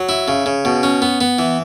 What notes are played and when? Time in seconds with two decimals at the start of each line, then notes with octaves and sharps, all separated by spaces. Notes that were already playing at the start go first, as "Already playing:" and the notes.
Already playing: F#3
0.09 E4
0.28 C#3
0.46 C#3
0.65 B2
0.83 C#4
1.02 B3
1.21 B3
1.39 E3